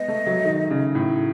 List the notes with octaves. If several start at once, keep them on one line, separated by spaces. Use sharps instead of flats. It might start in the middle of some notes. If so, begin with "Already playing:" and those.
Already playing: G#3 B3 D#5
A3
F#3
D#3
C#3
A2